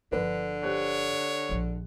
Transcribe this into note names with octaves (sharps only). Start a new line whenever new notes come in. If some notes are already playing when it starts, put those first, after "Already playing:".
G1 D3 F3 D4 B4
G4 C5 C#5 F#6
A#1 F3